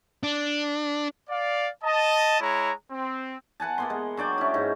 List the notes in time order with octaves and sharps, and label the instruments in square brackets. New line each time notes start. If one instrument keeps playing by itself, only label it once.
[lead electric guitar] D4
[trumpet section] D5 F5
D#5 A5
G#3 E4 C#5 A#5
C4
[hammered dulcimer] B4 F#5 G#5 A5
A#3 B3 C6
G#3
F#3 D4 D5 G5
C#4 E4
G#2